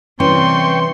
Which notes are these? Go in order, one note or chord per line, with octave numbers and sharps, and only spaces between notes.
C3 E3 G3 C#4 G5 C6 C#6